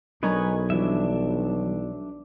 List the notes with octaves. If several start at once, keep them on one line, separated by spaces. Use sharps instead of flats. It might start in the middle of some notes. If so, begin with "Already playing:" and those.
B1 F#3 D4 A#4 B4 C#5 D#5 G#5
E3 F3 G3 D4 E5